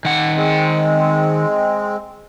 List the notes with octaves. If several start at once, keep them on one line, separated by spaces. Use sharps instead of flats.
D#3 F#5
G#3 C4